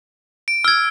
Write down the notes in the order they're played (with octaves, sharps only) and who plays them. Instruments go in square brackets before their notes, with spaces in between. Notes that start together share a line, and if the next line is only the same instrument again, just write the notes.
[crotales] D7
[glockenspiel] E6 G#6 [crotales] F6